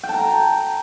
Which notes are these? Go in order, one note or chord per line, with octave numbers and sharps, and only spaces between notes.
G5
A5
A#5